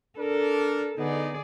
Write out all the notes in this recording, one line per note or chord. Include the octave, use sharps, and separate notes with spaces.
D4 A4 A#4
D3 B3 D#4 G#4 D5